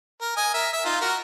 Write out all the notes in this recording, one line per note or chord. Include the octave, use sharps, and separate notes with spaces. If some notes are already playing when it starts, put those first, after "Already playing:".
A#4
D#5 G#5
A#4 E5
E5
D#4 F4
F#4 A#4